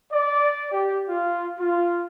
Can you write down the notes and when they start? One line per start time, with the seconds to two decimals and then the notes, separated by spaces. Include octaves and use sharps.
0.12 D5
0.72 G4
1.09 F4
1.59 F4